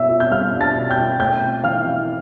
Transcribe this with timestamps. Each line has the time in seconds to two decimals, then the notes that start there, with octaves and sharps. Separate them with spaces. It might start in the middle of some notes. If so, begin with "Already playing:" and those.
Already playing: B2 D4 E5 E6
0.09 F4
0.20 G6
0.30 G3 F5 F6
0.53 D4
0.60 A5 A6
0.75 B2
0.90 G5 G6
0.97 F4
1.20 A3 G5 G6
1.43 C4
1.64 E3 F5 F6
1.87 E4